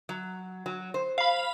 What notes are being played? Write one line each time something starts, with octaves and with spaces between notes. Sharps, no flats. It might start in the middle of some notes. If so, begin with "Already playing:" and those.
F#3
F#3
C5
F5 B5